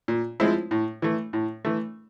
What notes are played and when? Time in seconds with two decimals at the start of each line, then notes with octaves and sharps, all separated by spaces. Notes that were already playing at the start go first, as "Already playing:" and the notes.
0.08 A#2
0.40 F3 G#3 C4 E4
0.71 A2
1.02 E3 A3
1.33 A2
1.65 E3 A3